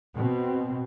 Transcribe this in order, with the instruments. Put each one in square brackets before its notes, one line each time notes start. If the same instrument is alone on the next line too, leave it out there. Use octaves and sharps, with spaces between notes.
[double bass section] B2 C4